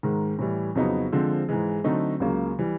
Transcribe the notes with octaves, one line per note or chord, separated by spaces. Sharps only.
G#2 D#3 G#3
A2 E3 G3
F2 C#3 F#3 B3 D#4
D3 F3 G#3 C4
G#2 E3 G#3
D3 F#3 A3 C4 D#4
C#2 C#3 F#3 A#3
E3 G3